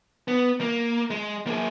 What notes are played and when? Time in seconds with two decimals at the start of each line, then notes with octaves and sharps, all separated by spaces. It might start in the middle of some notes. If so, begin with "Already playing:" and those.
0.28 B3
0.61 A#3
1.10 G#3
1.47 A#3 G#4